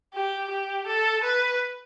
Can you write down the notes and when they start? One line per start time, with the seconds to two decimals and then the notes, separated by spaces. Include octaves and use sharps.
0.14 G4
0.50 G4
0.87 A4
1.23 B4